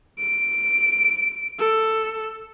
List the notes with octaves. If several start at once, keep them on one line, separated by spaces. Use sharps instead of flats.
D7
A4